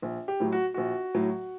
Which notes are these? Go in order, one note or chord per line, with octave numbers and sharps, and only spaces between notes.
A#1
G4
A2 F#3
F#4
A#1 F#4
A2 F#3